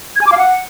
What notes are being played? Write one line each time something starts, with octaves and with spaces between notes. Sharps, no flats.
G#6
G#5
D6
F5
F#5